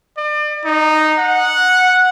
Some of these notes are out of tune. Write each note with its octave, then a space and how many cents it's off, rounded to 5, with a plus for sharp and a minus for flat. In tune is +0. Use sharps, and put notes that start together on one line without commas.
D5 +35
D#4 -10
F#5 -10